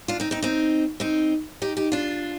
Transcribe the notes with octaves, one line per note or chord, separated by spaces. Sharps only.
D4 F4
C4 D#4
C4 D#4
C4 D#4
C4 D#4
D#4 G4
D#4 G4
D4 F4